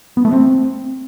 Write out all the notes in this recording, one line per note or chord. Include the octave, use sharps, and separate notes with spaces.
B3
A3
C4